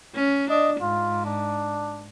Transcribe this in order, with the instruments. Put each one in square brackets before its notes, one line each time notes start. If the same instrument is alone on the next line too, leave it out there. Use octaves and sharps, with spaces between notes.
[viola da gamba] C#4
[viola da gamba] D4 [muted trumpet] D#5
[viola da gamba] G#2 [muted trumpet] F4
[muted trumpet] D4